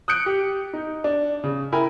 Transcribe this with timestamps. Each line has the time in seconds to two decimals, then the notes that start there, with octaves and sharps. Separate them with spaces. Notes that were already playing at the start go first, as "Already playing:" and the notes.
0.08 D#6 F#6 G6 C#7 D7
0.26 G4
0.73 D#4
1.04 D4
1.44 C#3
1.72 E4 A#4 G5 G#5 B5